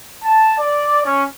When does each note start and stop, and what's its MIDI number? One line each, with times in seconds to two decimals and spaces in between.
0.23 0.54 81
0.58 1.04 74
1.05 1.24 61